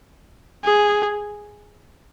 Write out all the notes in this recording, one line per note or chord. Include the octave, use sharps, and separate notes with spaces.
G#4